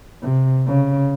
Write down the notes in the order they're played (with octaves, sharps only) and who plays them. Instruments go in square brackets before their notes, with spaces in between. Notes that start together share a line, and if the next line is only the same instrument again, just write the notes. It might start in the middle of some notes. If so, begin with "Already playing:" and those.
[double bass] C3
C#3